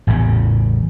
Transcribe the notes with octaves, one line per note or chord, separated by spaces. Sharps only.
A1 E2 A2 C#3